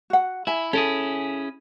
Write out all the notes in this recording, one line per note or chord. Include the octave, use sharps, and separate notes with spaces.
F#4 F#5
E4 E5 G#5
C#4 E4 G#4 A4